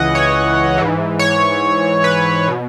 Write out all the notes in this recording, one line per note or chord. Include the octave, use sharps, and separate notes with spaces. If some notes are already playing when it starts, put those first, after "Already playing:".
Already playing: C#2 C#3 E3 D#5 F#5
C#5
G#2 E3
C#5
B4
B2